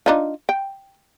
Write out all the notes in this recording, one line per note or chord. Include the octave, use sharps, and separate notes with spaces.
D4 D#4 F4
G5